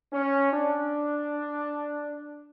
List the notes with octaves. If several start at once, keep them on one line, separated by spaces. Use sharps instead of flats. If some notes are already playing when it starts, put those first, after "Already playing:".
C#4
D4